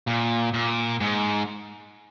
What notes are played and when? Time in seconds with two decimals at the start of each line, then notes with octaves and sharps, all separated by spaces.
0.07 A#2
0.54 A#2
1.00 G#2